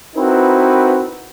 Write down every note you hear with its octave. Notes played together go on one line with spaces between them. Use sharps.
C4 D#4 E4 F#4 A#4 B4